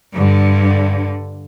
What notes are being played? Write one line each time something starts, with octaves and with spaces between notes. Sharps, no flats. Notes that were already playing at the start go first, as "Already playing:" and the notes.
G2 D3